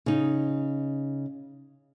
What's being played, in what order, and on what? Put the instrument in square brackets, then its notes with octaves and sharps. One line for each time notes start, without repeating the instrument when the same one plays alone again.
[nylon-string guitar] C#3 D#4